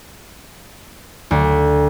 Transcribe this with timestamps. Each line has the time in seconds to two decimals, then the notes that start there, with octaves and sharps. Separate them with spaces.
1.31 D2